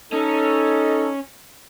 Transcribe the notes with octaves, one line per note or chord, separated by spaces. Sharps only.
C#4 D#4 A4